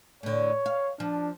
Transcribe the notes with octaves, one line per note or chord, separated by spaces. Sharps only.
A2 D3 C#5
F5
F3 D4